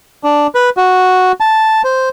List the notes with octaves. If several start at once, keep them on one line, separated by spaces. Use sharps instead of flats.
D4
B4
F#4
A5
C5